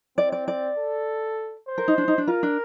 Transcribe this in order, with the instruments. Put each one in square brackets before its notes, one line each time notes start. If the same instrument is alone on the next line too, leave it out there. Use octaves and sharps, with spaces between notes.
[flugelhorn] C4 [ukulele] D5
[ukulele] D5
D5
[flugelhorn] A4
C5
[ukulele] A#4
D#4
D4
D#4
D4
[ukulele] F4 [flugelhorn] A#4
[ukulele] D4